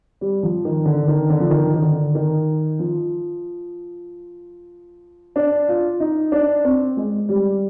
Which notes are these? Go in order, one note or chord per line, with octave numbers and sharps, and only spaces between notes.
G3
F3
D#3
D3
D#3
D3
F3
D#3
D#3
D3
D#3
F3
D4
F4
D#4
D4
C4
G#3
G3